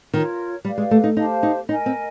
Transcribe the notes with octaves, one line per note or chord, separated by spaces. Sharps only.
D#3 F4 A#4 C#5
G3 G4 B4 D5 F5
G#3
A3
D#4
D#4 G4 C5 F5 A5
D#4
D#4 A#4 D#5 G#5
C4